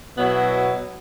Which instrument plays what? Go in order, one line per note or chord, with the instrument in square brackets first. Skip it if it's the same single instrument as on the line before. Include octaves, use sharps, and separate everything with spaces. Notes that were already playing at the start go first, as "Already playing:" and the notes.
[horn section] B2 F#3 B3 E4